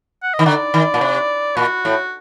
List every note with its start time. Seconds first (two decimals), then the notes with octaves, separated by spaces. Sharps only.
0.23 F#5
0.34 D#3 D#5
0.45 D3 D5
0.74 D#3
0.94 A#2
1.01 C3
1.57 A#2 F#4
1.85 A2